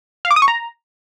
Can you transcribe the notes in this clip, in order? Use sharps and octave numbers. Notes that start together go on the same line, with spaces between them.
F5
D6
D#6
C#6
A#5